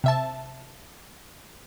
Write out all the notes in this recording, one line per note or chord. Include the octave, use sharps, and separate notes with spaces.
C3 E5 A5